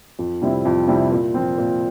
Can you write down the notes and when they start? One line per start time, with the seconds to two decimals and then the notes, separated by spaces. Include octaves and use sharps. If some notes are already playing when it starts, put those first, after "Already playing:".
0.19 F2
0.42 C3 G3 C4 E4
0.65 F2
0.87 C3 G3 C4 E4
1.11 A#2
1.34 F3 C4
1.58 A#2